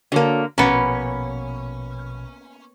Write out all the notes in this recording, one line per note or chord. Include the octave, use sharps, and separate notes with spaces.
D3 A#3 F#4 C#5 A5
A#1 B2 A#3 B3 C#4 B5